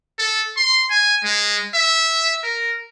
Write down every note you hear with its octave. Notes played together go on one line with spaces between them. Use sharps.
A4
C6
G#5
G#3
E5
A#4